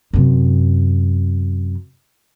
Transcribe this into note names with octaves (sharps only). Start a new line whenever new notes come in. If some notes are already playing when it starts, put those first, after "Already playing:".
F#2 C3